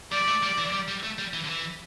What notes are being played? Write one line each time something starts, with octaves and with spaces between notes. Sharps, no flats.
G3 D5
A3
G3
E3
G3
G3
A3
G3
E3
D3
E3